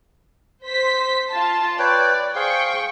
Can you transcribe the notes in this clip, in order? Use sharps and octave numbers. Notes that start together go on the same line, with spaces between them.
C5 B6
F4 A5
B4 C#5 D5 G5
G#4 C5 F5 G5 C#6